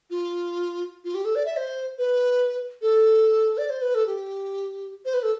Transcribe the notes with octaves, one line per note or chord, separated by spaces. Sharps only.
F4
F4
G4
A4
D5
E5
C5
B4
A4
D5
C5
B4
A4
G4
C5
B4
A4